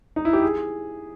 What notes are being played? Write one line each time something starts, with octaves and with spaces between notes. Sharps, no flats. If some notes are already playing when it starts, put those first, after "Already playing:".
D#4
E4
G4
G#4